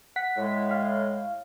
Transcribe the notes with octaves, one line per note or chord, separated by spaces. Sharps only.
F#5 B6
A2 G#3
F5